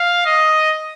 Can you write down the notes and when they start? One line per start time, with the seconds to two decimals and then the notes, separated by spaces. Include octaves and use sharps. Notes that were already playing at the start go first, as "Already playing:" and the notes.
Already playing: F5
0.26 D#5